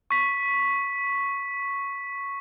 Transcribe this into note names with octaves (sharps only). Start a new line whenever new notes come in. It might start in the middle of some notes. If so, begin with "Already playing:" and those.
C#6 B6